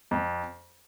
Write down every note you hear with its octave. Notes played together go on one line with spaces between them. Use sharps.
F2